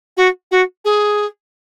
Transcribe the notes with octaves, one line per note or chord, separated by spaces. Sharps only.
F#4
F#4
G#4